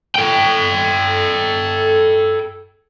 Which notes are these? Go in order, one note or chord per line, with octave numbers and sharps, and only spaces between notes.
A4 G5